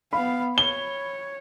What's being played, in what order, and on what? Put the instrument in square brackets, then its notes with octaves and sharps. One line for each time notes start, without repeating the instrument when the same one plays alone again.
[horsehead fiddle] B3 F5 [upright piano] B5
[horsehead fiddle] C#5 [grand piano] G7